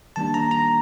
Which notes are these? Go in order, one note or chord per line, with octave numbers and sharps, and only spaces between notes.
D#3 G3 A#3 D4 A5
A#5
A#5